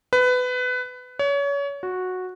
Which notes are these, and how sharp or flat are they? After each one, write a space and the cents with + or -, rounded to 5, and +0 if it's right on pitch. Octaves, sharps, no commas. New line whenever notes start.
B4 +20
C#5 +30
F#4 -10